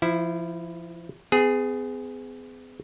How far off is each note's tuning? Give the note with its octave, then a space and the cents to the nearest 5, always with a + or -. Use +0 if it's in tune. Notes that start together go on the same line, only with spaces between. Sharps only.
F3 -25 E4 +0
B3 +45 G#4 +0